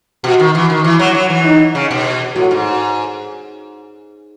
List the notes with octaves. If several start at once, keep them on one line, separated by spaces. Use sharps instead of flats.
B2 F#4
D#3
E3
D#3
E3 E4
F#3
F#3
E3
D#4
C#3
B2
A2 F#4
G#2